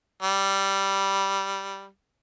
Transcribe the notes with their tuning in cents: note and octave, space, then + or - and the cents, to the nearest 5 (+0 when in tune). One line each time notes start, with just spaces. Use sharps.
G3 -5